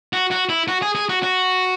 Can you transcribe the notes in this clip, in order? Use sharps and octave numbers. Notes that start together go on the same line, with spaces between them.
F#4
F#4
E4
F#4
G#4
G#4
F#4
F#4